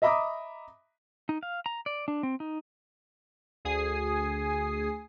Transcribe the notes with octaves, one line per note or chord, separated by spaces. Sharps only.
D#5 E5 A#5 B5 D6 D#6
D#4
F5
A#5
D5
D4
C4
D#4
D2 G#4 G#5 D#6 C7